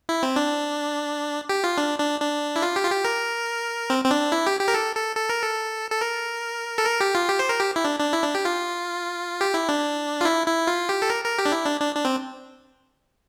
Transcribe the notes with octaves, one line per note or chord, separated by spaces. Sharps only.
E4
C4
D4
G4
F4
D4
D4
D4
E4
F4
G4
F4
G4
A#4
C4
C4
D4
E4
G4
G4
A#4
A4
A4
A4
A#4
A4
A4
A#4
A4
A#4
G4
F4
G4
C5
A#4
G4
E4
D4
D4
E4
D4
G4
F4
G4
E4
D4
F4
E4
E4
F4
G4
A4
A#4
A#4
G4
D4
E4
D4
D4
D4
C4